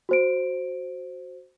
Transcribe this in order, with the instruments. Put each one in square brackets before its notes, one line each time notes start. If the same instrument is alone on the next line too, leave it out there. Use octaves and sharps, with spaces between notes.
[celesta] F#4 C5 D7